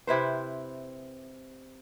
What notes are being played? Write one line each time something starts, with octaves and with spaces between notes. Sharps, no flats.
C3 E4 B4 C5